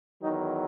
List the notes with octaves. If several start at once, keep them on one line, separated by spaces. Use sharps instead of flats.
E2 D#3 F#3 D#4